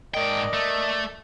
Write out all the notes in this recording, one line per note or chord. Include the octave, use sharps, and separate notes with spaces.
G#2 A#4 D5 D#5 G5
A3